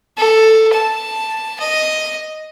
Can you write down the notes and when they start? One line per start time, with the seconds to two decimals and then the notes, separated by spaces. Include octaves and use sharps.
0.17 A4
0.73 A5
1.60 D#5